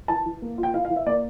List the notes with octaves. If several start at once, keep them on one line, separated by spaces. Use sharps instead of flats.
E3 A5
E3
A#3
F4
G5
E4 F5
F5
E3
E5
A#3 D5